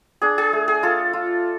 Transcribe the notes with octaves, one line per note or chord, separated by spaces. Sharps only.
D4 G#4
G#4
A3
G#4
F4 A4
F4